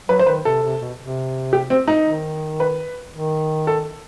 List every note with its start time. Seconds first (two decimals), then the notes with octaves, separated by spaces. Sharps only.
0.09 F#3 B4
0.19 C5
0.26 D#3 B4
0.45 C3 A4
0.63 C3
0.81 B2
0.99 C3
1.53 G4
1.70 C4
1.88 D#4
2.06 D#3
2.60 B4
3.14 D#3
3.67 A4